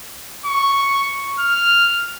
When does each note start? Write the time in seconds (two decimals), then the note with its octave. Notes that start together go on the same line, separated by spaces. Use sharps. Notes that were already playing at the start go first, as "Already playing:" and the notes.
0.46 C#6
1.39 F6